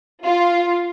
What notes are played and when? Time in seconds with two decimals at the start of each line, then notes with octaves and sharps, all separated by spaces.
0.25 F4